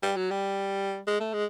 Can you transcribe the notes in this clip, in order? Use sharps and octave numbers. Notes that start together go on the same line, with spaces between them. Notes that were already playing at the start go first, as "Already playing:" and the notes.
G3
F#3
G3
G#3
A3
G#3